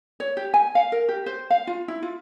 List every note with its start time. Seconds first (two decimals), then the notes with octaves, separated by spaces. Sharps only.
0.20 C#5
0.37 G4
0.54 G#5
0.75 F5
0.92 A#4
1.09 G4
1.26 C5
1.50 F5
1.67 F4
1.88 E4
2.03 F4